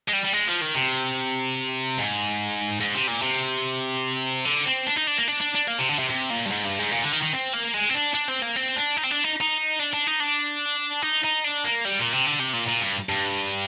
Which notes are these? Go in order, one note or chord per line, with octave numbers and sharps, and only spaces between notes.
G#3
G3
G3
G#3
F3
D#3
C3
G#2
G#2
C3
A#2
C3
D3
C4
D4
D#4
D4
A#3
D4
D4
D4
A#3
C3
D3
C3
C3
A#2
G2
G#2
G2
G#2
A#2
D3
D#3
D#3
C4
A#3
G#3
C4
D4
D4
C4
A#3
C4
D4
D#4
C4
D4
D#4
D#4
D4
D4
D#4
D4
D#4
D#4
D4
A#3
G3
A#2
C3
D3
C3
A#2
A#2
G2
G2